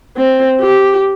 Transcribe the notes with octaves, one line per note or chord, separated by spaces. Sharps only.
C4
G4